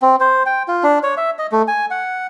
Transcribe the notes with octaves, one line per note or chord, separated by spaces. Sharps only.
C4
C5
G5
F4
D4
C#5
E5
D#5
A3
G#5
F#5